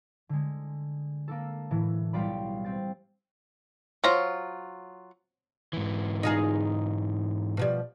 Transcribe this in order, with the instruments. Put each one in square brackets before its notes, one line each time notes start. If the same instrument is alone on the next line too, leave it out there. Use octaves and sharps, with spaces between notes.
[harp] D3 G#3
A#3 D4 A4
A2 E3
B1 G3 F4 D5 B5
C4 A6
[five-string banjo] F#3 F4 [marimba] C5 C#5 C6
[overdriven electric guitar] G#2 E3
[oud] D#4 F4 G#4
B2 F3 G3